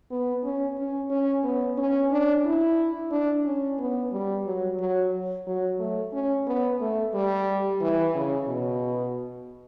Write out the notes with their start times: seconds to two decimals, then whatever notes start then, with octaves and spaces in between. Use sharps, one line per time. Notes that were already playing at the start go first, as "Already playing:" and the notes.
0.11 B3
0.44 C#4
0.78 C#4
1.11 C#4
1.44 B3
1.78 C#4
2.11 D4
2.46 E4
3.12 D4
3.46 C#4
3.79 B3
4.12 G3
4.46 F#3
4.79 F#3
5.47 F#3
5.80 A3
6.13 C#4
6.47 B3
6.81 A3
7.14 G3
7.81 E3
8.15 C#3
8.48 B2